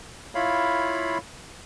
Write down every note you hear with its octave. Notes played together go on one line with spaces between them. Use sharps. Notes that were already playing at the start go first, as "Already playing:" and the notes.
E4 F4 C#5 F5 B5